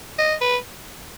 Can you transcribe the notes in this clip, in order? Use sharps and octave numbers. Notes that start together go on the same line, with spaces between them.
D#5
B4